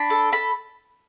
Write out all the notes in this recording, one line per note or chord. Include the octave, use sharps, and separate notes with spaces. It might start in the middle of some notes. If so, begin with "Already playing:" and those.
Already playing: D4 B5
A4
A4 B5